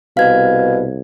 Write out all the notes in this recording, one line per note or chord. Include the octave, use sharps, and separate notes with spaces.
C2 B2 F5 G#6